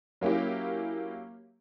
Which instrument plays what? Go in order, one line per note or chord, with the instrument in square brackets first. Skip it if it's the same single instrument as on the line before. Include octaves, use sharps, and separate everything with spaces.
[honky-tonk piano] F#3 A#3 C#4 E4 G4